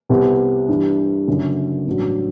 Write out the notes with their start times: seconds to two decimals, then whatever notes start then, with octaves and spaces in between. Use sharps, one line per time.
0.09 C2 C3 G3 B3
0.68 G2 E3 G3
1.27 F#1 F#2 D3
1.87 A1 G2 F#3